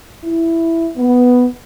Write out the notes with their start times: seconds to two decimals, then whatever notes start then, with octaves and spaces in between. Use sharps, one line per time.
0.25 E4
0.98 B3